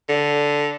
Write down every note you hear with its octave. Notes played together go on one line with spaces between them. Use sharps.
D3